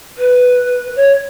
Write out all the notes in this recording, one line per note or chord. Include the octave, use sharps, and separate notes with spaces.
B4
C#5